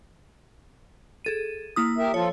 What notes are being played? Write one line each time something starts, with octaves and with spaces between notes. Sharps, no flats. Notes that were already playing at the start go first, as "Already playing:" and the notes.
G#4 A4 D#7
A#3 E4 D#6
G4 A#4 E5
F3 F4 A4 C#5